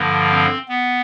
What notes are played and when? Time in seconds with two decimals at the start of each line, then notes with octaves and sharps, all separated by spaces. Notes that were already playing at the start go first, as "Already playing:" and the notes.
Already playing: G2 D3 F3 A#3
0.31 C4
0.69 B3